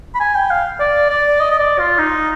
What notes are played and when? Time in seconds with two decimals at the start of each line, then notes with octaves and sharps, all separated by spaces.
0.15 B5
0.20 G#5
0.35 G5
0.50 F5
0.79 D5
1.09 D5
1.40 D#5
1.51 D#5
1.59 D5
1.79 F4
1.99 D#4